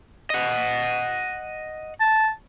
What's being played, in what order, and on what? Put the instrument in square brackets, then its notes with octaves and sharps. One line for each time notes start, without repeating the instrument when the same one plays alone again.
[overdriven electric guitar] D#5 F#5
[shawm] A5